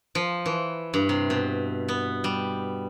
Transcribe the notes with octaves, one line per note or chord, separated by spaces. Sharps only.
F3
E3
G2
C3
B2
B3
G3